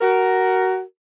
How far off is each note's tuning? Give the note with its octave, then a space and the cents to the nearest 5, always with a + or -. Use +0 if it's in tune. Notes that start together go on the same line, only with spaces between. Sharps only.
F#4 +20 A#4 +0